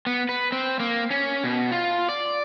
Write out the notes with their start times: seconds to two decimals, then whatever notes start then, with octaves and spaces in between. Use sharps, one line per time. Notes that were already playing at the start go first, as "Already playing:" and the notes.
0.06 B3
0.29 B4
0.52 C4
0.80 A#3
1.11 C#4
1.44 B2
1.72 F4
2.09 D5